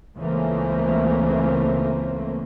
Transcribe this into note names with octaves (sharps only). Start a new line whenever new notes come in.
C#2 C#3 E3 A3 A#3 C4